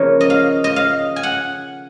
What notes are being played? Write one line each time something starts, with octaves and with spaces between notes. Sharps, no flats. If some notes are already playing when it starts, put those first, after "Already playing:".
Already playing: C#3 F3 A#3 C#5
D#5
F5
D#5
F5
G#5
F#5